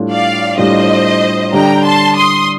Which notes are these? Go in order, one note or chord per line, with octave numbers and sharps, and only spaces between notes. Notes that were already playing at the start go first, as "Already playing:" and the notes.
Already playing: A2 G3 D4 F4
D5 F5
A2 G3 D4 F4 C5 D#5
D3 G3 D4 G5 A#5
A5 C6
C6 D#6